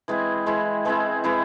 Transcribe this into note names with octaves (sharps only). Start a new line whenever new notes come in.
E3 G#3 C4 E4
E3 G#3 C4 E4
E3 G#3 C4 E4
E3 G#3 C4 E4